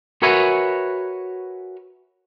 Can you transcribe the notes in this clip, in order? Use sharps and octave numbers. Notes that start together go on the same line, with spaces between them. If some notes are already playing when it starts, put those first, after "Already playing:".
F#4 A#4 B4 C#5 E5 G#5